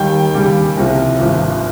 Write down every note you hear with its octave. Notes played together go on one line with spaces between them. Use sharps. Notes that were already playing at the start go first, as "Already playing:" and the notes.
Already playing: D#2 D#3 G3 G5
D#2 C#3 G3
C2 C3 F3
G#1 G2 F3